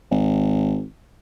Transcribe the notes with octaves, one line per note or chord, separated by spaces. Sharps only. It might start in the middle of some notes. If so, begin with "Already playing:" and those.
G#1